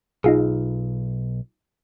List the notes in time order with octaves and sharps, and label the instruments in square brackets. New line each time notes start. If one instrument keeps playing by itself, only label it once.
[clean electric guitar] B1 [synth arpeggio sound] D#4 F4 G#4